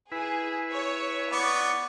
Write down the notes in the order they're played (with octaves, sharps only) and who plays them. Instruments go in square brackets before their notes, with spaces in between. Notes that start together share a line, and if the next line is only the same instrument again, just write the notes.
[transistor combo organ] E4 B4 [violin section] G#4
[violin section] C#5
[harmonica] B3 D5 [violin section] C#6